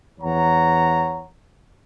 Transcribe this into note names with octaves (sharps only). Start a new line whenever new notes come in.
E2 C#5 F#5 A#5